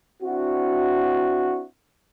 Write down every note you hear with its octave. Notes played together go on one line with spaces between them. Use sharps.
C4 D4 E4 F#4